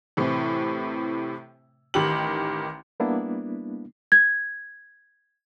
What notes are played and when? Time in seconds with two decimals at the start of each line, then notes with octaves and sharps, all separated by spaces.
0.17 A2 C3 E3
1.94 A1 D#3 G4 F#7
3.00 G3 A#3 B3 D4 E4
4.12 G#6